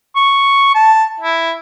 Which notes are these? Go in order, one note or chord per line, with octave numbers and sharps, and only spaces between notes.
C#6
A5
E4